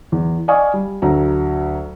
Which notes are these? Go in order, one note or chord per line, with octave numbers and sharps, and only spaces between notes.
E2
D5 D#5 F5 G#5 C#6 D#6
G3
D2 F#3 A#5